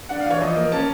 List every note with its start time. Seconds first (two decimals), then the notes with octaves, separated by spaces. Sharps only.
0.09 D4 F#5
0.20 F5
0.26 E3 C#5
0.41 F3 D#5
0.56 A#3
0.72 C#4 A5